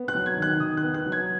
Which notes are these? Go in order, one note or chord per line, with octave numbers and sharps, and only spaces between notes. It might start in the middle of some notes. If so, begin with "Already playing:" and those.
Already playing: B3
F#6
F#3
G#6
D#3
F#6
D#3 D#6
F#6
B3
F#6
F#3
G#6